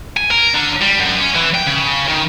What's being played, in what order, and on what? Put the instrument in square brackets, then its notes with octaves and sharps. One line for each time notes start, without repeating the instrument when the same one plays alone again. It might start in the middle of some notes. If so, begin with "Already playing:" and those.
[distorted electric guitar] G#5
A#4
D3
G3
F#2
C#4
E3
G5
C#3
D#3